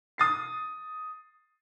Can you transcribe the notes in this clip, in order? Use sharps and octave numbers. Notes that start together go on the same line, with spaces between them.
D#6 A6 C7